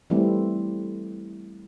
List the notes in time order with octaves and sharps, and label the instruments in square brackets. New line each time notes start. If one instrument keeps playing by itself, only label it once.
[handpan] E3 G3 A3 C4 E4